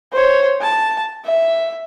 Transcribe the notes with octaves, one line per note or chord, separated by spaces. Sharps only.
C5 C#5
A5
E5